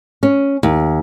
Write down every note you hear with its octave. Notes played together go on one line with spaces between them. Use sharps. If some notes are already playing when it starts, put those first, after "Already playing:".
C#4
D#2